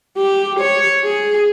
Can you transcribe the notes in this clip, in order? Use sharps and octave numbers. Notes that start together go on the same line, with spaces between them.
G4
C#5
G#4